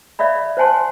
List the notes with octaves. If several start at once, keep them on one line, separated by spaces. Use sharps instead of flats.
C#5 D5 E5 F5 B5
C5 C#5 F#5 G#5 A5 C6